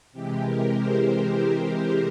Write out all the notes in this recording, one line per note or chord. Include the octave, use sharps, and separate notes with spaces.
C3 E3 G#3 G4
A#4
C5